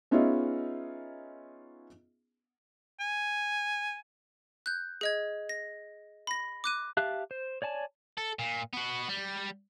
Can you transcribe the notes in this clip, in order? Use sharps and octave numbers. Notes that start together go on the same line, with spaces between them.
B3 C#4 D#4 F4 G#4 E5
G#5
F#6 G6
G#4 D#5 G#6
A#6
B5 A#6
D6 F#6 D#7
G4 E5 F5 A5 F#6
C5
C#5 D5 G#5 A5
A4
A#2
B3 F#4
G3